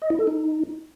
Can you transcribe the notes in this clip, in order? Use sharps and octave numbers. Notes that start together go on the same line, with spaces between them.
D#5
E4
A4
D#4